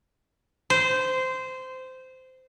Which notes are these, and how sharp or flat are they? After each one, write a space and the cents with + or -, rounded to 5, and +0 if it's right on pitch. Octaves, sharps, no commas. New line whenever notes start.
C5 -15